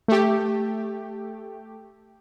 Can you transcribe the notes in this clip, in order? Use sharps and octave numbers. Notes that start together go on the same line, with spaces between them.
A3 G4